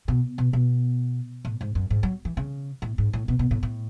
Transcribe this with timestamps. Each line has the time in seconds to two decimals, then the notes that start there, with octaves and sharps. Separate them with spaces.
0.08 B2
0.38 B2
0.53 B2
1.45 A2
1.61 G#2
1.75 F#2
1.90 G#2
2.03 F#3
2.25 E3
2.37 C#3
2.82 A2
2.98 G#2
3.13 A2
3.28 B2
3.39 B2
3.51 A2
3.63 A2